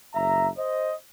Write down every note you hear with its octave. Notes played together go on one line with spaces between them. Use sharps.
F#1 E5 A#5
C5 D#5